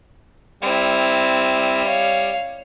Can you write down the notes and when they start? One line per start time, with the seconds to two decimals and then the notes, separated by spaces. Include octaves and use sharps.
0.62 G3 C4 E4
1.87 C#5 F5